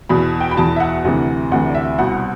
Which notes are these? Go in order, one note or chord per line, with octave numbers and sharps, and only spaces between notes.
E2 B2 B5
G5
B5
E2 B2 A5
E5
F#5
D2 C3 E3
D2 C3 E3 F#5
D5
E5
C2 B2 F#5